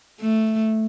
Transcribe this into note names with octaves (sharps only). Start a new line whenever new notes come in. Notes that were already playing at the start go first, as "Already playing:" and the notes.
A3